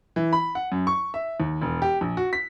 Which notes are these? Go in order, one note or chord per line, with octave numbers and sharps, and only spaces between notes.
E3
B5
F#5
F#2
C#6
E5
D#2
E1
G4
A#1
F#4
B6